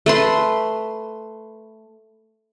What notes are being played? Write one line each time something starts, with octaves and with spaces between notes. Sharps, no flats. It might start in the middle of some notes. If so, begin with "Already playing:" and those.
A3 B4 C6